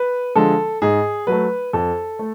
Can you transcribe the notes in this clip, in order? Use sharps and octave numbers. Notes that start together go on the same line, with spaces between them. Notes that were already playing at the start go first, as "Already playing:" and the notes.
Already playing: B4
D3 F3 G#3 A4
G#2 G#4
F#3 A3 B4
F2 A4
A3